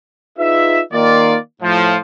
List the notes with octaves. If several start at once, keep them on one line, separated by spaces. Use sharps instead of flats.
D#4 F4 G#4 B4 E5
D#3 A#3 F4 D5
A2 F3